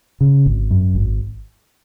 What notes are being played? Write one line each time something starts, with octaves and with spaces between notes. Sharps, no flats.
C#3
G#1
F#2
G#1